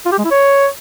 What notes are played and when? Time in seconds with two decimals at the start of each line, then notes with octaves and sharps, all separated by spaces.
0.06 F4
0.12 G4
0.18 G#3
0.24 E4
0.31 C#5